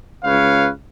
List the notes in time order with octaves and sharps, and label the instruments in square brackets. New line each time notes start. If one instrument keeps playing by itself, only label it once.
[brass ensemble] C#2 C#3 B4 C#5 F5